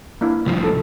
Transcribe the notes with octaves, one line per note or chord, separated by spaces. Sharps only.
A#3 D4 E4
C2 F3
A4